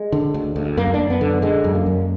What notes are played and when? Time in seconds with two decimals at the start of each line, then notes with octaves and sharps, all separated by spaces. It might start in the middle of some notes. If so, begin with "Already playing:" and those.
Already playing: G#3
0.12 D3
0.34 D2
0.56 D2
0.77 F#2 A#3
0.94 D4
0.99 F#2
1.10 B3
1.21 D3
1.42 D3 G#3
1.64 F#2
1.75 A#3
1.86 F#2